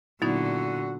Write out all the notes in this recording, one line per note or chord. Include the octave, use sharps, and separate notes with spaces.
A#2 D3 F#3 B3 D#4 E4 F#4